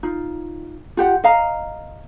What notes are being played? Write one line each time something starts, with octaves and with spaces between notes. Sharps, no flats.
D#4 F4
F4 G4 F#5
D#5 F5 A#5